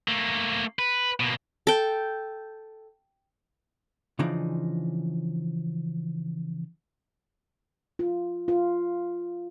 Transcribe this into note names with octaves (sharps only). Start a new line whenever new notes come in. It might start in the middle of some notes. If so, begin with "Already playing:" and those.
A3 A#3
B4
B2 A#3
A4 G5
C#3 E3 F3 D4 D#4
F4
F4